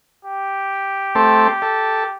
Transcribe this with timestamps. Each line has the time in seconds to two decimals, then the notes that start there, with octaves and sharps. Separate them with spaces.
0.25 G4
1.15 A3 C4 A4
1.62 A4